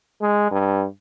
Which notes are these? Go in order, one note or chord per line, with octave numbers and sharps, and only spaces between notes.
G#3
G2